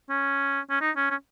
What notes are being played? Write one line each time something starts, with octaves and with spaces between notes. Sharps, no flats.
C#4
C#4
D#4
C#4
C#4